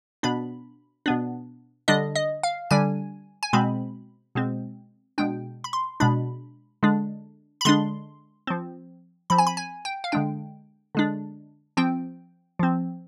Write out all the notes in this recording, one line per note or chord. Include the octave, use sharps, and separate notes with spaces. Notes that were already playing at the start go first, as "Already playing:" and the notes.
B2 B3 D4 B5
B2 B3 D4
D3 G3 D4 D#5
D#5
F5
D3 G3 D4 G#5
G#5
B2 G#3 C4 B5
B2 G#3 C4
B2 G#3 D4 G5
B5
C6
B2 G#3 D4 B5
D3 G#3 D4
B5
D3 G#3 D4 C6
F3 C4
F3 C4 B5
G#5
B5
G#5
G5
F5
D3 G#3 D4 G5
D3 G#3 D4
F3 C4 G5
F3 C4